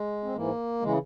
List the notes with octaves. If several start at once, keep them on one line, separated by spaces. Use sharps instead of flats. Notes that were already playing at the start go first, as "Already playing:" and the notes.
Already playing: G#3
C4
G#2 E3 A#3
C#3 E3 G#3